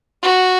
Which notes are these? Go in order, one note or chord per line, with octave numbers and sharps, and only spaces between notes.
F#4